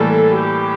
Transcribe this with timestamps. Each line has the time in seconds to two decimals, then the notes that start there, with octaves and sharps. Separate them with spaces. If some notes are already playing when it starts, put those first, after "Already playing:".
Already playing: A2 E3 G3 A#3 A4
0.35 G4